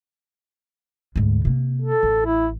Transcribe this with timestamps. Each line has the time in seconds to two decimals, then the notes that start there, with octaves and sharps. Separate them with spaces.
1.16 D2 G#2
1.45 C3 A#3
1.82 A4
2.03 A1
2.26 E4